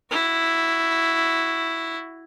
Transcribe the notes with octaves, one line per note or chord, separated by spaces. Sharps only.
E4 F#4